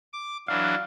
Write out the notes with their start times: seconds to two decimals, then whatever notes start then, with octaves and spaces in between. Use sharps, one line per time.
0.13 D6
0.48 E3 F#3 D4 F5